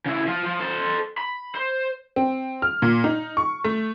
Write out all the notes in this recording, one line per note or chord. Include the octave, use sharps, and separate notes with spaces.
C#3 E4
F3 F4
F3
A4 C5
B5
C5
C4
F6
A#2
D#4
C#6
A3